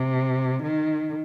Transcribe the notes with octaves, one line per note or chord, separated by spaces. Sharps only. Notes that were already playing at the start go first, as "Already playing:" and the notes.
Already playing: C3
D#3